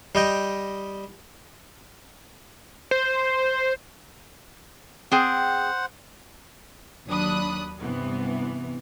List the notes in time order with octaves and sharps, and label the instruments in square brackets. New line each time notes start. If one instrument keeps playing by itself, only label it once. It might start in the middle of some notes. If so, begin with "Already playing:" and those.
[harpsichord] G3 D#5 G5
[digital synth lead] C5
[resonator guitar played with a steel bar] C4 G#4 G5 [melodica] C5 F#5
[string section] D#2 F#3 D4 B5 D#6 F#6
G2 C3 E3 B3